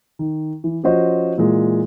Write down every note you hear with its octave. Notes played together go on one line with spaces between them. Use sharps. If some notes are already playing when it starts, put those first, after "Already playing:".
D#3
E3
F3 C#4 F#4 C5 D#5
A#2 E3 G#3